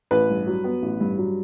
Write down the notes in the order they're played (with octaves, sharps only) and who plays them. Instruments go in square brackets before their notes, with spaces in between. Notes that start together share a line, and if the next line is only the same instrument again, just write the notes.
[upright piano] A1 B4
G2
F#3
B3
A1
G2
F#3